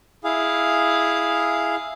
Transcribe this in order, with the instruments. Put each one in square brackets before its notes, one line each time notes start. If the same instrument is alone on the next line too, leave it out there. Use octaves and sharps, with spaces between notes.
[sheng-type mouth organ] E4 G#4 F5